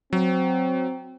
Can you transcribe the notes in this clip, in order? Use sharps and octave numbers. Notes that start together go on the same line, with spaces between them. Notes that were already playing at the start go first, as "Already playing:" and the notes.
F#3 C4